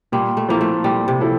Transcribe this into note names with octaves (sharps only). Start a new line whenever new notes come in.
A#2 G3
A3
F3 A#3 C4 E4 A4
A3
A#2 G3
C3
F3 C4 E4 A4